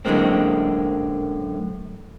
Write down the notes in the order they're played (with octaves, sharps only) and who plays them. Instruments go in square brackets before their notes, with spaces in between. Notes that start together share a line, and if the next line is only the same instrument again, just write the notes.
[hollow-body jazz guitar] F#2 A2 D3 G#3 A#3 C4